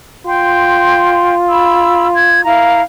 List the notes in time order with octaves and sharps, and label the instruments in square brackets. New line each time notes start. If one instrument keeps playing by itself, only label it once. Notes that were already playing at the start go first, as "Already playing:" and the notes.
[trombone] F4 [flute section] G5 C6
[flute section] B5 E6
G#6
E4 F5 A#5